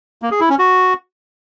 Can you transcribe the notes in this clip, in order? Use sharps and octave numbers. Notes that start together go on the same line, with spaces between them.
A#3
G#4
E4
C#4
F#4